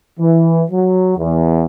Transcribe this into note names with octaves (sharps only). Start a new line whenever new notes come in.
E3
F#3
E2